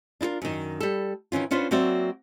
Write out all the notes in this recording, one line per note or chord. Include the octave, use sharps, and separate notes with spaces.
D4 E4 F4 A#4
F#2 D#3
G3 A4
D#3 E3 C#4 F4
B3 C#4 D4 F4 B4 C5
F#3 A#3 C4 F#4 D5 E5